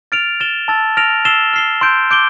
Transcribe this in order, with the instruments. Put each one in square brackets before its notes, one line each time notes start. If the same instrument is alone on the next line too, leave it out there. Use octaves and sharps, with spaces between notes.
[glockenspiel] F6 A6 D7 F7
F6 A6 E7 G7
A5 E6 A6
F6 A#6 D7 F7
E6 A6 C7 E7 G7
F6 C7 G7
C6 E6 G6 D7
D6 G6 D7 G7